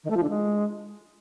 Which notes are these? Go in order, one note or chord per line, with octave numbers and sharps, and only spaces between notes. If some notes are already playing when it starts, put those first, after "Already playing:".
D#3
A3
F3
D3
G#3